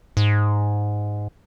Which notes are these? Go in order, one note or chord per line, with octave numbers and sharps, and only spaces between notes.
G#2